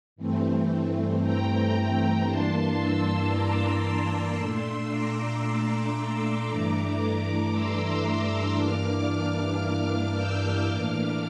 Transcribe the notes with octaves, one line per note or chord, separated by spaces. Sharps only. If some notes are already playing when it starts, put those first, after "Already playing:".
G2 E3 A3 C4
G5 A#5
G2 E3 A#3 D4 A5 C6
C6 E6
A#5 D6
C6 E6
A#2 A3 D4 C6 E6
A#5 D6
C6 E6
G2 E3 A3 D4 A#5 D6
C6 E6
G2 E3 A#3 D4 D6 F6
E6 G6
A2 E3 A#3 D4 D6 F6